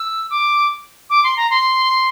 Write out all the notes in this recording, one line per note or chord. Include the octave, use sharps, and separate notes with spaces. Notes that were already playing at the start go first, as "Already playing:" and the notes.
Already playing: E6
D6
D6
C6
A#5
C6